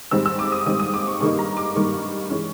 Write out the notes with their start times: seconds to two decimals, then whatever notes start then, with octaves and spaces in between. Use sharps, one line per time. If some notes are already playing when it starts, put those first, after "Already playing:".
0.11 G#2 D#3 G3 C4 E6
0.26 E6
0.39 D6
0.52 D#6
0.66 G#2 D#3 G3 C4 D#6
0.79 D#6
0.94 D6
1.07 C#6
1.20 G2 D#3 G3 A#3 D#4 C#6
1.39 A#5
1.57 D6
1.75 G2 D#3 G3 A#3 D#4 C#6
2.30 E3 G#3 C#4